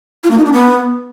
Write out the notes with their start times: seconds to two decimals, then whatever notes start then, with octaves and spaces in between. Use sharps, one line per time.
0.24 F4
0.31 A#3
0.38 D#4
0.45 D4
0.52 B3